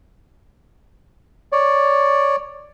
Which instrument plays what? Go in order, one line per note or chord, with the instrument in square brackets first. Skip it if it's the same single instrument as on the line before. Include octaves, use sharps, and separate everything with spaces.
[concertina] C#5 D5